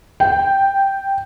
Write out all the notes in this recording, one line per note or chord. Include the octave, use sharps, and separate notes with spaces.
G5